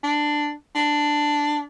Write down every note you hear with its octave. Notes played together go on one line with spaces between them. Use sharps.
D4
D4